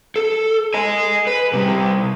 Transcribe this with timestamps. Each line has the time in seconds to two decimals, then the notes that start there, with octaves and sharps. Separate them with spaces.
0.16 A4
0.74 D#5 G#5
1.27 B4
1.54 C3 G3